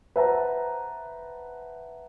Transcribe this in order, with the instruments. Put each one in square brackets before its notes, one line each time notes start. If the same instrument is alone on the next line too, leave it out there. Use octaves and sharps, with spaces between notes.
[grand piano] B4 C5 E5 F#5 A5 A#5